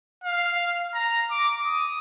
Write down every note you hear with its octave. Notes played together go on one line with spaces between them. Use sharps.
F5
A#5
D6
D#6